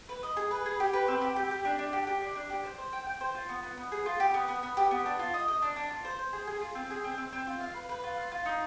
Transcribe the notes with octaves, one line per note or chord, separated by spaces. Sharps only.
B4
D#5
G#4
B4
G#4
G4
B4
C4
G4
G4
G4
D4
D4
G4
G4
D4
D4
G4
C5
C5
G5
G5
C5
F4
B3
B3
B3
G#4
F4
G4
B3
B3
B3
G4
B3
D4
F4
D#5
D#5
D4
D4
F4
C5
C5
G#4
G#4
F4
C4
G#4
C4
C4
C4
F4
F5
B4
B4
F4
F5
F4
D#4